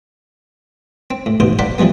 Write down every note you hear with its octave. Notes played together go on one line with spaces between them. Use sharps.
C4
A2
A1 G#2 B2 C5
C5 D5 F5 F#5 A#5 B5
E3 F3 G3 G#3 B3